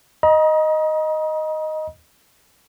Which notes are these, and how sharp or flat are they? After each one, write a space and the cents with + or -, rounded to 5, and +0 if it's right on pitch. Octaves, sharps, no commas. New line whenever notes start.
D#5 +0 A#5 +40 D#6 +20